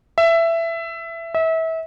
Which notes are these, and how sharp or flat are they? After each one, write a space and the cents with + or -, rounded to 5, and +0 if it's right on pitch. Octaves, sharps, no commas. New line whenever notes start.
E5 +15
E5 -30